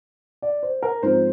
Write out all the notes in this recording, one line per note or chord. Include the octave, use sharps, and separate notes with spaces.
D5
C5
A#4
G#2 F3 C4 C5